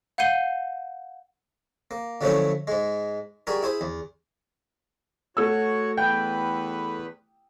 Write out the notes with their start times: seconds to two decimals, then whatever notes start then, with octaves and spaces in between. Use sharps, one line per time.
0.18 F5 F#5 G6 C7 D#7 G7
1.91 A#3
2.21 D3 F3 F#3 A3 C#4 E4
2.67 G#2 G#3
3.47 G3 F#4 G#4 A#4
3.63 E4 G#4 C5
3.81 E2
5.37 A3 F#4 C#5 E6
5.97 E2 B4 G5